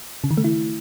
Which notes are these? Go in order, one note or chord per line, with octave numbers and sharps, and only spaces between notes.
C#3
D#3
A3
E4